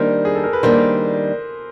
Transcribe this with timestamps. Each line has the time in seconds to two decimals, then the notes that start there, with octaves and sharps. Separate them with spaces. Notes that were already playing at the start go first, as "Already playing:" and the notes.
Already playing: D#3 G3 A#3 D4 A#4 C5
0.25 G#4
0.35 A4
0.44 A#4
0.53 B4
0.63 D#3 G3 A#3 D4 A#4 C5